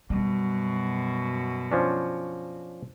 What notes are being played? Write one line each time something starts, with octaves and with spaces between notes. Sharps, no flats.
F#2 B2 G3
F3 C#4 D4